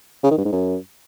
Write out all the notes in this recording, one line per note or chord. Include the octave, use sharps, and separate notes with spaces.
C#3
D#3
G2
G#2
F#2